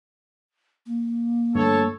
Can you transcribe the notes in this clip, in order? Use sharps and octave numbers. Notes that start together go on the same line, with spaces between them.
A#3
G2 D3 A3 A4 C#5